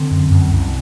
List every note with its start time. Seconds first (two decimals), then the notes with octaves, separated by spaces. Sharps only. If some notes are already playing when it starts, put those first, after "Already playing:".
Already playing: D3 C4
0.11 F#2
0.31 F#2
0.51 C2